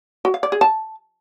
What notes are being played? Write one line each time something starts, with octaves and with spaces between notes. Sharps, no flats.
F#4
F5
D5
G#4
A5